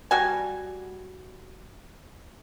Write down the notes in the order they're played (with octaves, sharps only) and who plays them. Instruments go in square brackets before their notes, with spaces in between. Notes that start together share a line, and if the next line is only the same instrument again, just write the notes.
[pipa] G3 F#4 G#5